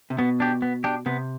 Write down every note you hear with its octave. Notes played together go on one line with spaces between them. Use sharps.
C3
B2 B3
D4 G4
B3
D4 G4
C3 B3